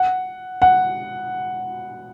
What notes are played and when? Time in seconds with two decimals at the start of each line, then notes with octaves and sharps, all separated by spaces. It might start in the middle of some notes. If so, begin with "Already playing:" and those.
Already playing: F#5
0.62 F#5